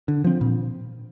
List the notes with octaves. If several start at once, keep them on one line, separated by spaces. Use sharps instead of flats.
D3
F3 C4
A#2